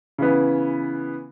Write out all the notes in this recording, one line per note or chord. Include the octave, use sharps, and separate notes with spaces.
C#3 E3 B3